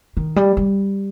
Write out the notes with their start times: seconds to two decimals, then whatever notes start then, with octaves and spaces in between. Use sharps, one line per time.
0.17 D#3
0.36 G3
0.57 G3